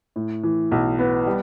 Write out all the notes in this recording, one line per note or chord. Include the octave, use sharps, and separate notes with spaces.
A2
E3
B1
B3
G3